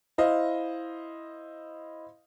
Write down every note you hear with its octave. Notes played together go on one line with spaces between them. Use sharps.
E4 C5 D#5 F5